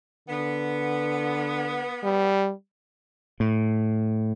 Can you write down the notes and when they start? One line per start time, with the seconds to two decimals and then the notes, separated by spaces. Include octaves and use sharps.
0.29 D3 B3
2.03 G3
3.40 A2